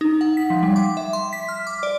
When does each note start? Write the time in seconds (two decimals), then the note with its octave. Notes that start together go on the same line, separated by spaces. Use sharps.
0.01 D#4
0.21 F#5
0.37 B6
0.50 F3
0.63 G3
0.76 D6
0.97 E5
1.13 C6
1.33 B6
1.48 F6
1.67 D6
1.83 D5